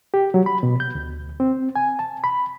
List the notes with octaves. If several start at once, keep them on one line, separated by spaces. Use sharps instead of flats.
G4
F#3
B5
B2
G6
D2
C4
G#5
A5
B5